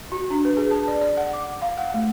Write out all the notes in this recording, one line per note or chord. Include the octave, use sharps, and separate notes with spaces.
F#4
D4
B4
G#4
A5
D5
D5
F#5
D6
F5
F#5
A3